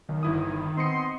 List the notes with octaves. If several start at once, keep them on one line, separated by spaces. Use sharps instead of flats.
B1 D#3
G1 E4 D#6
B3 C4 D#5 C6 C#7